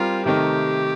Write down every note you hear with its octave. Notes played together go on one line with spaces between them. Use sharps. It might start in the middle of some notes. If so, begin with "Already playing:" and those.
Already playing: G3 C4 F4 G4 A#4
C3 D#3 A3 D#4 G4 A#4